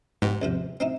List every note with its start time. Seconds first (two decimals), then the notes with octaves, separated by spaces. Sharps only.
0.22 G#2 B3 G4
0.42 E2 C3 F3
0.80 C4 D#4 E4